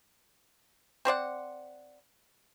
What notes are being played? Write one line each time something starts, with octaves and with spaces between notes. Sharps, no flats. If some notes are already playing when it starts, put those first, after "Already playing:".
C4 C5 D5 F#5